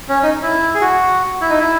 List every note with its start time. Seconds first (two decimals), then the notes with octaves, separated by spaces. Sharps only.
0.09 C#4
0.23 D#4
0.43 E4
0.74 G#4
0.81 F#4
1.41 E4
1.50 D#4
1.60 E4